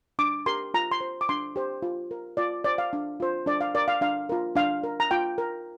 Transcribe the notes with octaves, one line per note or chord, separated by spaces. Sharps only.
D4 D6
G4 A#4 C6
F4 A#5
C6
C5
D6
D4 C6
G4 C5
F4
A#4
F4 D5
C5 D5
F5
D4
F4 C5
D4 D5
F5
A#4 D5
F5
D4 F5
F4 A#4
D4 F5
A#4
A#5
F4 G5
A#4